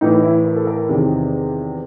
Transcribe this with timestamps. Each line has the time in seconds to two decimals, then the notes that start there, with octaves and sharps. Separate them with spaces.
0.01 A2 E3 D#4
0.23 E4
0.45 A#4
0.56 A4
0.67 A#4
0.89 E2 C3 D#3